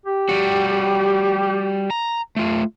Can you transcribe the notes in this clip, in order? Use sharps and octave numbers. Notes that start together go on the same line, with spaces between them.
G4
G3 F#4
A#5
A3 F4